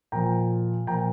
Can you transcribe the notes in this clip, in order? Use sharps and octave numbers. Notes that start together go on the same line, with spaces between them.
A#2 F3 G5 A#5
A#2 F3 G5 A#5